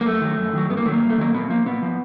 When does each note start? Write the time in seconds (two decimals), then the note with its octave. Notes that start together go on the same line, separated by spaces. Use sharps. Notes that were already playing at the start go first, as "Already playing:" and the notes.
0.01 A#3
0.05 F#2 A3
0.21 D#3 F#3
0.38 F#2
0.53 D#3 F#3
0.70 G2 B3
0.77 A#3
0.86 D#3 A3
0.89 F#3 A#3
1.02 G2
1.10 A3
1.17 D#3 F#3 A#3
1.34 A#2 B3
1.49 F3 A#3
1.66 A#2 B3
1.82 F3